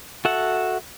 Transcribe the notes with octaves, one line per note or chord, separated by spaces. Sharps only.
F#4 A4 E5 F#5